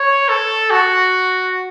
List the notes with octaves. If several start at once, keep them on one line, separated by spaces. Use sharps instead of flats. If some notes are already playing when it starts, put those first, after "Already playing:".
Already playing: C#5
A4
F#4